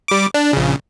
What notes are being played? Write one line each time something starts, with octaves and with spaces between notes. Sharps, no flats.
G3 D6
D4
A#1 C#3